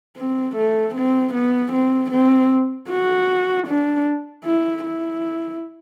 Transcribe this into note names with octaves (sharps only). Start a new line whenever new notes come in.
C4
A3
C4
B3
C4
C4
F#4
D4
E4
E4